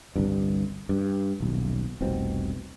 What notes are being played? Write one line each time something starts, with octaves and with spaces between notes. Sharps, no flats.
G1 C2 G2
G2
D#1 B1
F1 C2 B2 C4